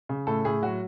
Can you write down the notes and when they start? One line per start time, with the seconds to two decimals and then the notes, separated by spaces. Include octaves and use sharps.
0.09 C#3
0.27 A2 A4
0.45 A2 G#4
0.63 F#3 F#4